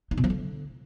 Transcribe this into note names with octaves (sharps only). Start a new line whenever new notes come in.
D#4
B2
F3
D3